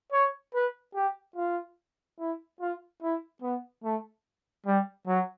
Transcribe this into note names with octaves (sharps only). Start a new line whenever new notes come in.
C#5
B4
G4
F4
E4
F4
E4
B3
A3
G3
F#3